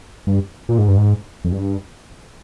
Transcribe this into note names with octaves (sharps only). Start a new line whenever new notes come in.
G2
A#2
G#2
G2
G#2
F2
G2